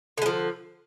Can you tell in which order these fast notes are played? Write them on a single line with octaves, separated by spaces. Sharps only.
D3 G#3 F3